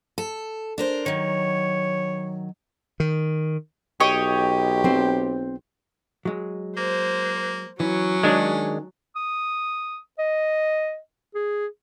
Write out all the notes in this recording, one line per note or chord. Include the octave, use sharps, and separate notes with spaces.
A4
D4 A#4 C5
D#3 F#3 C#5
D#3
B1 G4 C#5 D#5 G5
C4 C5
F#3 G#3
A#3 C5
E3 F#3 C#4
D#3 G#3 D4 G#4
D#6
D#5
G#4